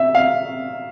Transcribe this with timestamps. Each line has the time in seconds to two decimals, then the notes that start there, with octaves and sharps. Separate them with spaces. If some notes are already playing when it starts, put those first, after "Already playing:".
Already playing: E5
0.15 F5